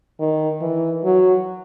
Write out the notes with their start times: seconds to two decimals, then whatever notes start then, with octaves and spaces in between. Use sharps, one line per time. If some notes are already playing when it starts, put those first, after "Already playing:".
0.20 D#3
0.61 E3
1.04 F#3